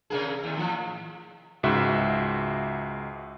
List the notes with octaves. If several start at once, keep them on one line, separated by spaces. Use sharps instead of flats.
C3 A#3 G#4
D#2
A2 F3
C#2 G#2 F#4 E5